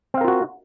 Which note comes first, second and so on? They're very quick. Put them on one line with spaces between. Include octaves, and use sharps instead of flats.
C4 F5 A#4 F4 F#4